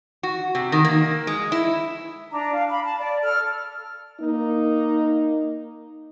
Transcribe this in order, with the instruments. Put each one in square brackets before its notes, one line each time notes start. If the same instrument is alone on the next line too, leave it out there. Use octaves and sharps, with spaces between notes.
[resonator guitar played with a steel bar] F#4
C3
D#3
A#3
G#3
E4
[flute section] D4 A#5
F5
B5
A5
D5
A4 F6
[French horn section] A#3 D#4